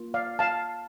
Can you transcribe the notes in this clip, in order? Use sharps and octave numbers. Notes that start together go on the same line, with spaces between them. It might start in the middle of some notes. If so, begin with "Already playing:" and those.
Already playing: A#3 F4
D5 F5
F5 A5